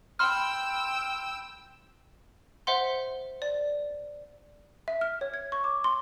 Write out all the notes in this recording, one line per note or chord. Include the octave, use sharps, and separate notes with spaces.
G5 B5 C6 E6 F6
C5 E5 F#5 C6
D5
E5
F6
C#5
G#6
C#6
D6
C6